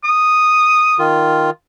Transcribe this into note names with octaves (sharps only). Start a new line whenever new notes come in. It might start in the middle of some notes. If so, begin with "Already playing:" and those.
D#6
D#3 F4